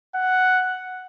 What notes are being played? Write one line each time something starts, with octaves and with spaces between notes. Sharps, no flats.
F#5